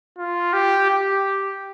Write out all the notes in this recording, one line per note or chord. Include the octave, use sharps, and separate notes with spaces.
F4
G4
G4